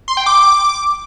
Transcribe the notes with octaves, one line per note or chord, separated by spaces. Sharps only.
C6
G5
D6